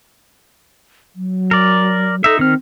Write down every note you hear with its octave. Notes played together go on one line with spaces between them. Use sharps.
F#3
A#4 D5
D#4 A4 E5
D#3 C4 F6